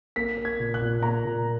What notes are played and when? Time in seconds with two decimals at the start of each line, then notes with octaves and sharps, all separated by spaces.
0.16 A#3 B6
0.37 A#3
0.45 G#6
0.59 A#2
0.74 F#6
0.81 A#2
1.03 A#3 A#5
1.25 A#2